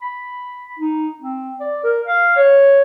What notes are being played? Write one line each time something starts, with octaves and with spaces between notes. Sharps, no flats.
B5
D#4
C4
D5
A#4
F5
C#5